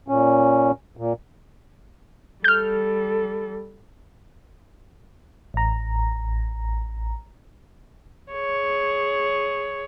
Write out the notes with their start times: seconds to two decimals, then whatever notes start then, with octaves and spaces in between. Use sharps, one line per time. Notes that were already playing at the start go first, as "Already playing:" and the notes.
0.08 A#2 C#4
0.97 A#2
2.44 G3 A4 F6 G6
5.54 A1 A#5
8.32 G#4 C#5